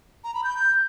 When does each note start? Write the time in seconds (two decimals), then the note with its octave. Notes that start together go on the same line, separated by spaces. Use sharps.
0.24 A#5
0.34 B5
0.44 G6